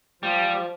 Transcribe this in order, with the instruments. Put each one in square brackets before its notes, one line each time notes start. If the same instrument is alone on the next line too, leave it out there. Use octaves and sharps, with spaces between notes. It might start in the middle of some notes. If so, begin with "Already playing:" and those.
[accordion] F3 [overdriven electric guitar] G3